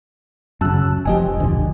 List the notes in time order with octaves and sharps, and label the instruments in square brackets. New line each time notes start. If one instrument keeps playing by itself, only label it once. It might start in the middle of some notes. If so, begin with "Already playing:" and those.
[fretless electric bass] F#2 C#3 [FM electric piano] A5 E6 F#6
[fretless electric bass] F1 A#2 F3 [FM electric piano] G4 D#5 G#5
[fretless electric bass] G#1 A#2 D3 [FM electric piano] D2